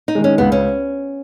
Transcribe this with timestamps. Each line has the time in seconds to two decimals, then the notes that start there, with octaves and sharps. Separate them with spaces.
0.08 D#4
0.15 D#3 G#3
0.24 C#4
0.38 C#2 B3
0.52 C#4